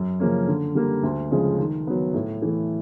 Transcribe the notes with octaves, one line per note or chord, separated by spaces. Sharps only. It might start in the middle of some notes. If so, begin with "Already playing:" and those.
Already playing: F#2
C#3 F3 A#3 C#4
D3
G3 A#3
D2
C#3 F3 G#3
D#3
F#3 B3
A2
E3 A3